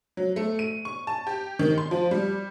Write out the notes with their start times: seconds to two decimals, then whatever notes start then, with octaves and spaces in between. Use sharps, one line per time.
0.17 F#3
0.36 A3
0.59 D#7
0.85 C#6
1.07 A5
1.27 G4
1.59 D#3
1.78 C6
1.91 F3
2.11 G3